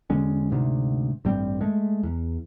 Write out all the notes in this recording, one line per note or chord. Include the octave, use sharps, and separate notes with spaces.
E1 D3 G#3 C#4
D2 G#2 C3
A1 G2 G3 C4
G#3 A3
E2